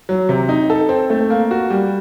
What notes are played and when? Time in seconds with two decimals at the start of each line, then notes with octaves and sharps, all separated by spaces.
0.09 F#3
0.29 C3
0.49 D#4
0.70 A4
0.89 C4
1.10 A3
1.30 A#3
1.51 F#4
1.70 G3